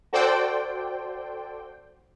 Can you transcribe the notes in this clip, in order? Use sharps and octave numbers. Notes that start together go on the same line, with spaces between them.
F#4 A4 C5 D5 G5